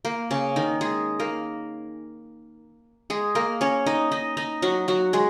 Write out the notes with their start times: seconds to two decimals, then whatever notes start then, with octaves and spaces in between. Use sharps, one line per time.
0.05 A#3
0.31 C#3 C#4
0.56 D#3 D#4
0.81 G#3 G#4
1.20 A#3 A#4
3.10 G#3 G#4
3.35 A#3 A#4
3.61 C#4 C#5
3.86 D#4 D#5
4.12 D#4 D#5
4.37 D#4 D#5
4.62 F#3 F#4
4.88 F#3 F#4
5.13 G#3 G#4